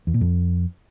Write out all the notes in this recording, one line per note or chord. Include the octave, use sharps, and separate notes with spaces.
E2
A#2
F2